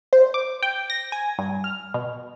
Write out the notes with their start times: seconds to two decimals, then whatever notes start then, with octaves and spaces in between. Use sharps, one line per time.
0.13 C5
0.34 D6
0.63 G5
0.90 A#6
1.12 G#5
1.39 G2
1.64 F6
1.94 B2